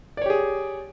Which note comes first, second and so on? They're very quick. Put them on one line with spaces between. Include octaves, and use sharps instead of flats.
D5 C#5 G4 G#4